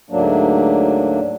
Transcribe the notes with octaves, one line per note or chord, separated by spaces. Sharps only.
D2 G#2 F#3 A#3 D4